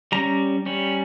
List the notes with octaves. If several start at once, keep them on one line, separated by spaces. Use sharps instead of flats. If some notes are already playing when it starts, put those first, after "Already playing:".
G3 C#4 A#5
G3 C#4